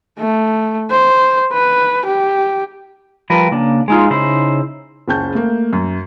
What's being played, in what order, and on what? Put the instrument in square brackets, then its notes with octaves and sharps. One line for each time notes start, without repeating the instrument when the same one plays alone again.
[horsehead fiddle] A3
C5
B4
G4
[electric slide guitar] F3 G3 A#4 B4
C#3 A#3 D4
G#3 D#4 F4
C#3 D#4 E4 C5
[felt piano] F#1 C#2 C#4 A5 G6
A3 A#3
F#2